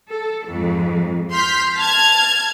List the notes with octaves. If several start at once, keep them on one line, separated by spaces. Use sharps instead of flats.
A4
F2 G#2
C6 F6 G6 B6
A5 F6 G#6